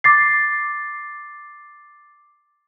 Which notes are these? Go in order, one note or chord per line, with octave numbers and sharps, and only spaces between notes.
D6 A6 C7